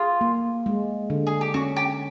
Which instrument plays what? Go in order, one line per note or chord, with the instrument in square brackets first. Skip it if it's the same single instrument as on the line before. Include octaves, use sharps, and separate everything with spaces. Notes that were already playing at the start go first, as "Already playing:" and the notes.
Already playing: [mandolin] F4 [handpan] G#4
[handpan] A#3
G#3
D3
[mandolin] G#4
G4
[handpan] C#4 [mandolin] F#4
[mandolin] G4